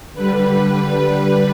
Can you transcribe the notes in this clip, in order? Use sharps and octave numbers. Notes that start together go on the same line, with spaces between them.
D3 G3 B4